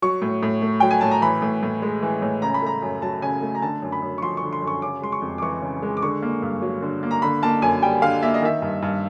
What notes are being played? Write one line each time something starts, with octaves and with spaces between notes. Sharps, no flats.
F#3 C#6
A2
A2
A3
F#3 G5
G#5
A2 A5
A#5
E3 B5
A2
A2
G#3
E3
A2
C#3 A#5
B5
A3 A#5
F#2
F#3 A5
C#3 G#5
A3
A#5
D3 A5
F#2
B5
F#2
C#6
F3 C6
C#6
D3
C6
F#2
C#6
C#3 D6
G#3 C6
C#6
F2
D6
E3 C#6
C#3
G#3
D6
D3 C#6
A#3
G2
F#3
D3
A#3
A#5
D3 B5
A#3 A5
F#2 G#5
G3 G5
D3 F5
A#3 E5
D#5
D#3 E5
G2
G2